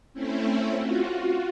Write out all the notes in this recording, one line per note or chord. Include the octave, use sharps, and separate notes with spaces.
A3 C4 C#4 E4
F4 F#4